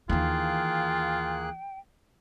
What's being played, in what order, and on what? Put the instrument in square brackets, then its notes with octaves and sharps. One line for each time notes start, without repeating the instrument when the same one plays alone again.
[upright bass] D#2 E3 [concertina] A#3 G#4 F#6 [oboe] F4 [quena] G5